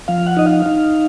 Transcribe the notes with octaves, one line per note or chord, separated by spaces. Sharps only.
F3 F5
F#5
D#4 D#5
F5
D#4